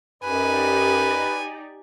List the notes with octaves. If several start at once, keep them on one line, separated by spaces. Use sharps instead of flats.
F#2 D#4 G4 B4 D5 G#5